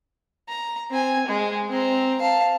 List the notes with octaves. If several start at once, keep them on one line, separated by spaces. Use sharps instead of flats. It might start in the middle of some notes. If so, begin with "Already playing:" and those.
A#5
C4 G#5
G#3
C4 A#5
F5 A5